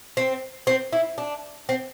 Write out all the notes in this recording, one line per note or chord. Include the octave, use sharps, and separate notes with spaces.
C4
C4
E4
D4
C4